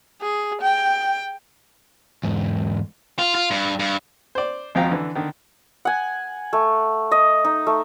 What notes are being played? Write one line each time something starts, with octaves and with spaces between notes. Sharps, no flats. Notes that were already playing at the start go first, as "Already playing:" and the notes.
G#4
G5
E2 G#2
F4
F4
G2
G2
C5 D5
G#1 F2 F3 F5 G5 A#5
D3 E3
D3 D#3
F#5 G#5
A3
D#5
D#4
A3